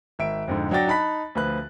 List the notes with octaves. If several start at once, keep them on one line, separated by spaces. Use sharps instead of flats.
G#1 E5 D7
F2 G#2 D3
F#3 D4 F#5 G5 A6 A#6
D#4 A5 B5 F#6 B6
D2 F3 B4 F#6